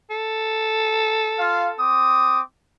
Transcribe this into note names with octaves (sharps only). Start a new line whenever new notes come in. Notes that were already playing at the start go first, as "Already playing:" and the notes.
A4
F4 F5
C4 D6 D#6